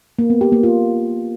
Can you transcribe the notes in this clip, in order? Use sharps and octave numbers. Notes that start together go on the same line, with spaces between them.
A#3
B3
G4
A#3
F4